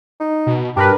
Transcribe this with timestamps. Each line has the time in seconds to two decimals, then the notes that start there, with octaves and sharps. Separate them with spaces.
0.20 D#4
0.47 B2
0.76 G2 D4 G4 A#4 B4